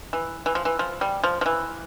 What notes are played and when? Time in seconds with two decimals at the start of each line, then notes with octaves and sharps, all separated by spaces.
0.13 E3
0.46 E3
0.55 F3
0.65 E3
0.79 F3
1.01 G3
1.24 F3
1.41 F3
1.46 E3